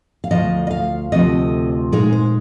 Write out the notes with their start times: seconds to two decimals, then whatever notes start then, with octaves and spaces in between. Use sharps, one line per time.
0.24 F5
0.31 D2 C3 F3 D#5
0.67 D#5
0.71 F5
1.12 D2 C3 F3 D#5
1.92 A#2 G#3 D#4 G#4
2.13 C5